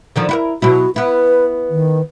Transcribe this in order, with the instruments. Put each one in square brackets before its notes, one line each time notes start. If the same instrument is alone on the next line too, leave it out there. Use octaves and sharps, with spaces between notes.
[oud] D3 D#3 F3
E4 F#4 A#4
[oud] B2 F#3 E4 [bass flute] F#4
[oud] B3 E4 [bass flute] B4
[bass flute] D#3